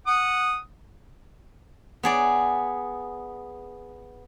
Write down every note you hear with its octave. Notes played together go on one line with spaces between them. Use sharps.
F#5 D#6
B3 G#4 D5